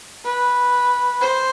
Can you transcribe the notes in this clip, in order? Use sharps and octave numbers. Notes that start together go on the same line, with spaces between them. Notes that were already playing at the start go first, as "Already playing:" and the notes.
B4
C5